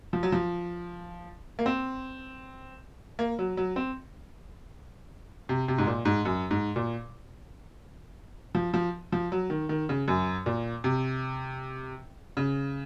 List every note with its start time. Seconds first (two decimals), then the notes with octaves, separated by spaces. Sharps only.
0.13 F3
0.23 F#3
0.32 F3
1.59 A#3
1.66 C4
3.19 A#3
3.39 F#3
3.57 F#3
3.76 C4
5.49 C3
5.68 C3
5.78 G#2
5.87 A#2
6.05 G#2
6.25 F#2
6.51 G#2
6.76 A#2
8.55 F3
8.74 F3
9.12 F3
9.32 F#3
9.50 D#3
9.69 D#3
9.89 C#3
10.08 F#2
10.46 A#2
10.84 C3
12.37 C#3